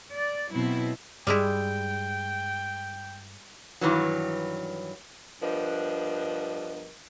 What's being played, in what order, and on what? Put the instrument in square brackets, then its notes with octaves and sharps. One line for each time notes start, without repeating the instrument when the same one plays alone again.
[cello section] D5
B2 F#3 C4 E4
[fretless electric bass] G2 [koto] G3 G#3 E4 [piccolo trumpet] G5
[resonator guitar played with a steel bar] G2 D#3 E3 F#3
[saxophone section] G2 F3 B3 D4 A#4 D#5